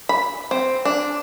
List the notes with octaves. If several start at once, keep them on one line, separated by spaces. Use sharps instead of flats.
B5
C4
D4